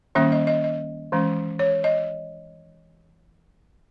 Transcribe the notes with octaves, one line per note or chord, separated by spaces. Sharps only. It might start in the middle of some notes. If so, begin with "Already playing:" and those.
D#3 G3 A#3 C#4 E5
D#5
D#5
D#5
E3 G#3 C#4
C#5
D#5